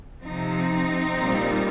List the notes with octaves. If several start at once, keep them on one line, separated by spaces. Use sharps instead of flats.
C3 F3 C4 D#4
A#2 G3